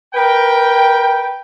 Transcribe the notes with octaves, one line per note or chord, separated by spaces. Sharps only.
A#4 B4 G5